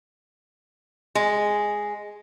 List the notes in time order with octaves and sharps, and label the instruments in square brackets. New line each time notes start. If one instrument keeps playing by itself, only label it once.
[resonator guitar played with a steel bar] G#3